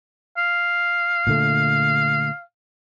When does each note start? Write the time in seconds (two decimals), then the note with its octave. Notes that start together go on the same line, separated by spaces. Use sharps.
0.37 F5
1.27 A#2 D3 A3